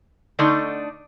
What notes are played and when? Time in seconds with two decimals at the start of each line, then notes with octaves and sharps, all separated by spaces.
0.39 D3 A3 D4 D#4 A4